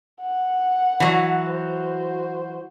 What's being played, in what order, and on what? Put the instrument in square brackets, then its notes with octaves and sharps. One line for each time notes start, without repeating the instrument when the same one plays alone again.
[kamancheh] F#5
[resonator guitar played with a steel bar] E3 F#3
[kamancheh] F#4 C5